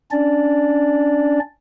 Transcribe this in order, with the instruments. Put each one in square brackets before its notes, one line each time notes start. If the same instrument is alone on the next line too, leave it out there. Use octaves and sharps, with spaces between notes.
[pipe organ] C#4 D4 D5